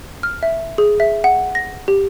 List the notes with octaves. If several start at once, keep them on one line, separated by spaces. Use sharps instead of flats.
F6
E5
G#4
E5
F#5
A#6
G4